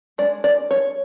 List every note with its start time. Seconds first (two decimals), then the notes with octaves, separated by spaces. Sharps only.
0.18 G#3 D5
0.21 D4
0.44 D5
0.71 C#5